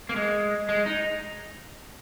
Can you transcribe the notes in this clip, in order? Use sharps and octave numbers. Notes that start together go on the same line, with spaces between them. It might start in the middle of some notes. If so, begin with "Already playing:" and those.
A#3
G#3
G#3
D#4